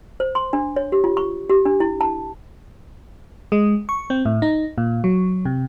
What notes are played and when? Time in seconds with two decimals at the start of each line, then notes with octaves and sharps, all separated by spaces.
0.20 C5
0.35 C6
0.53 D4
0.76 C#5
0.92 G4
1.04 F4
1.17 C#6
1.50 G4
1.65 D4
1.80 E4
2.01 A5
3.52 G#3
3.89 C#6
4.10 C4
4.25 A2
4.42 D#4
4.78 A#2
5.04 F#3
5.45 C3